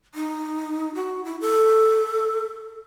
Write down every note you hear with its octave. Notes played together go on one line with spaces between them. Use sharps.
D#4
F#4
E4
A4